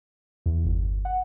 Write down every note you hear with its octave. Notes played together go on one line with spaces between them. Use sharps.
E2
G1
F#5